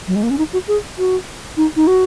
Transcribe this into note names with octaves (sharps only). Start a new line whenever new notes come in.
F#3
G#3
A#3
C#4
D#4
F#4
G#4
F#4
D#4
D#4
F#4